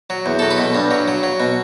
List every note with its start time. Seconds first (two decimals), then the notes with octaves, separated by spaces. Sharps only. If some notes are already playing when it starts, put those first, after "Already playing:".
0.10 F#3
0.26 E2
0.39 F#3 A4
0.51 B4
0.58 B2
0.75 G2
0.91 F#3
1.08 F#3
1.23 F#3
1.40 B2